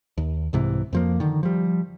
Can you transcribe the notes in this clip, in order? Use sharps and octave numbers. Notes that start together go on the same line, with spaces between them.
D#2
C2 G#2 C3 E3
F2 F3 A#3
D3 D#3
F3 G3